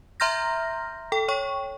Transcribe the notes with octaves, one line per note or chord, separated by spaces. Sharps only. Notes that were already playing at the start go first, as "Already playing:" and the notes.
E5 A#5 C6 F6 G6 A#6
A4 G5
C#5 G5 C#6